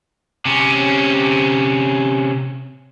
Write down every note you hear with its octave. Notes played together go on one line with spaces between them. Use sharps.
C3 C#4